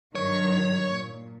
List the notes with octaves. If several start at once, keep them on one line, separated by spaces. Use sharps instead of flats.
G2 D#3 F#3 C#5
A#2